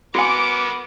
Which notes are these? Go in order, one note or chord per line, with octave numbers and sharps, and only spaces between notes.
B3 F#4 A#4 F#5 G#5 D6